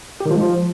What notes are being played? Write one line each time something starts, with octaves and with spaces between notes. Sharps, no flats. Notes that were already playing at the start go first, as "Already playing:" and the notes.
G4
D#3
F3
G#3
F3